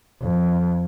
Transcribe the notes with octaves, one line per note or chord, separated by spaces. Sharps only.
F2